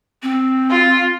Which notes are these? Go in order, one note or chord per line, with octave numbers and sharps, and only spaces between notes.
C4
F4